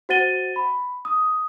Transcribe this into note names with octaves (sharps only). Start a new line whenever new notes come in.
F#4 C5 F#5 A6 D#7 G7
B5
D#6